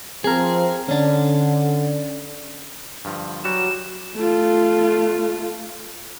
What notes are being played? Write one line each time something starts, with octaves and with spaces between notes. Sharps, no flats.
F3 C4 G#4 A#4
D3 C#4 D4
G2 D3 F3
E3 F#3 G3 F#4 E7
A3 F4